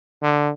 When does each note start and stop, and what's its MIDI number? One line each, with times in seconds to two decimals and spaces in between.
0.23 0.50 50